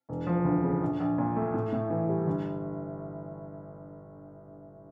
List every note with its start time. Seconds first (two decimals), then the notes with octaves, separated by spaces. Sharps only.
0.09 E1
0.27 F3
0.45 D2
0.63 C#3
0.82 A#1
1.00 A#1
1.18 A#2
1.36 A3
1.54 A2
1.72 A2
1.90 E3
2.09 G3
2.27 G1